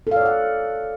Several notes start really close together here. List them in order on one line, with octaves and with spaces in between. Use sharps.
A4 F5 D5 C#5 F#5